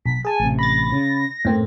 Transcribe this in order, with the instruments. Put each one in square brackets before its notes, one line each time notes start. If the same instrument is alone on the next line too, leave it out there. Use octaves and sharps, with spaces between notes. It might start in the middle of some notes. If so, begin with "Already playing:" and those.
[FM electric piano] B1 [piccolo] B6
[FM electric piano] G#4 A5 [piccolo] G#5
[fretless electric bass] A1 C3
[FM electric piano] B5 A6 [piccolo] A#6
[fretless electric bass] C#3
[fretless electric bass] F#2 A#3 [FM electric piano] A2 C4